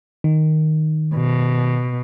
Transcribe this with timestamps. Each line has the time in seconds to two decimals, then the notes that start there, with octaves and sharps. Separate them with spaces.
0.24 D#3
1.15 B2